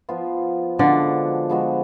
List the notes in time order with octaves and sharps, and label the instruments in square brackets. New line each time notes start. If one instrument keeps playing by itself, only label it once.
[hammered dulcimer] F3 B3 F4
[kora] D3 D4 [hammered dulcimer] F3 G#3 B3 F#4
[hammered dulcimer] F3 G#3 B3 F#4